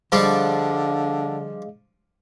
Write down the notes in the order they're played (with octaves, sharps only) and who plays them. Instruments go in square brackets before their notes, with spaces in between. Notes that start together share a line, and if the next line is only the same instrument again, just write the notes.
[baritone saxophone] D3 [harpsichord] F3 G3 D4 [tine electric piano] G#4 D#5 F5